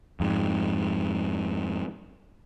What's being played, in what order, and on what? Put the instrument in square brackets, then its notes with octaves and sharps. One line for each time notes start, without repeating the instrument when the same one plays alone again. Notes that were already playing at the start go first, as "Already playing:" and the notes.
[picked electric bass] F2 G#2